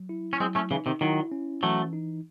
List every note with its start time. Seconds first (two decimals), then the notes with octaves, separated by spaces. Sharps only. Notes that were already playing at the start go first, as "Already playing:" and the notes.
Already playing: F#3
0.09 E4
0.33 C#4
0.40 F#3 G#3 C4
0.55 A3 C#4
0.71 C#3 E3 D#4
0.86 C3 D#3
1.01 D#3 F#3 E4
1.32 C#4
1.63 E3 F#3 A3
1.93 D#4